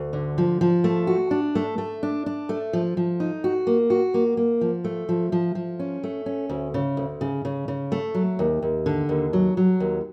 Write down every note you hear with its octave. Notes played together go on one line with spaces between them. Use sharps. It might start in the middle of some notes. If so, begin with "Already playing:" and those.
Already playing: D2
D3
F3
F3
A3
F#4
D4
A3
A3
D4
D4
A3
F3
F3
D#4
F#4
A#3
F#4
A#3
A#3
F3
A3
F3
F3
F3
C#4
A3
C#4
D2
C#3
D2
C#3
C#3
C#3
A3
F#3
D#2
D#2
D3
D#2
F#3
F#3
D#2